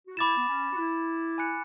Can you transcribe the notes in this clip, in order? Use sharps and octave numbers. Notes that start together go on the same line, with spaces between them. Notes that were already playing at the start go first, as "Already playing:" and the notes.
F#4
E4 B5 D6 A6 E7
B3
C#4
F#4
E4
G#5 B5 F#6 C#7